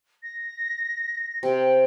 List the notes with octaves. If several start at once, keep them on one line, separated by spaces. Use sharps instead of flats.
A#6
C3 G5